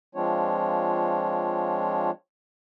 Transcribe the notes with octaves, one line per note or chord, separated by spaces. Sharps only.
F3 G#3 C4 D4 F4 C#5